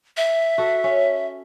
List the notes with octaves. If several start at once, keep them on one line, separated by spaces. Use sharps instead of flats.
E5
F#4 A4
C#4